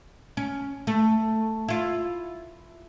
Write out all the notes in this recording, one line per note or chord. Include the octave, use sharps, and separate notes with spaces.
C#4
A3
E4 F4